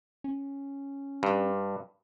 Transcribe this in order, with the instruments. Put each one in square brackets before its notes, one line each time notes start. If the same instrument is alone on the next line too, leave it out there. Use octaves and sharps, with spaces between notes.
[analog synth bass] C#4
[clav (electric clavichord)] G2